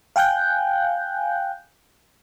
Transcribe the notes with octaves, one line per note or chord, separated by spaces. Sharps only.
F5 G5 G#5 F#6 G6